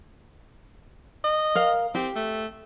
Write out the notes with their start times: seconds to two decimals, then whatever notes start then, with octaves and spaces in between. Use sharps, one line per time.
1.24 D#5
1.55 A#4 F5
1.95 C4 G4
2.16 A3